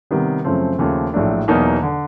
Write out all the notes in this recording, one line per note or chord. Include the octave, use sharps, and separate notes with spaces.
C3 D#3 G3 B3
F#2 C#3 F3 A3 C4
D#2 C#3 F3 A3
A#1 A2 F#3 A3 D4
E2 B2 F#3 A#3 D#4
D3